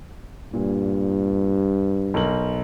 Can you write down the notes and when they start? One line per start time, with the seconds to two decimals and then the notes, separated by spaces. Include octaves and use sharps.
0.54 G2 A#2
2.14 B1 A#4 F#7